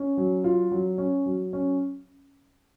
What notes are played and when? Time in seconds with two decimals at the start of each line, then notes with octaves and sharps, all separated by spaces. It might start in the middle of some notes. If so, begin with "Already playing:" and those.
Already playing: C#4
0.17 F#3
0.44 F4
0.72 F#3
0.98 C#4
1.26 F#3
1.53 C#4